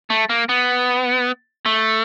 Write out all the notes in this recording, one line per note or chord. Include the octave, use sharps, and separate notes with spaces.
A3
A#3
B3
A3